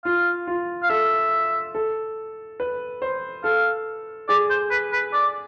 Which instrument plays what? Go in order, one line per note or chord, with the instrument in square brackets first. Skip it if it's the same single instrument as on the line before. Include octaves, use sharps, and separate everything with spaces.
[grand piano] F4 [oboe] F5
[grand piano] F4
[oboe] F5
[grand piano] A4 [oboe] E5
[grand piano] A4
B4
C5
[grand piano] A4 [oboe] F5
[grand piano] G#4 [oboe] D5
[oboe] C5
B4
B4
D5